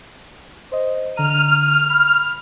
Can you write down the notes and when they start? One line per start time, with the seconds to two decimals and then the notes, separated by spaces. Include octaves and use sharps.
0.72 C5 D#5
1.16 D3 A#5 F6 D#7
1.90 B5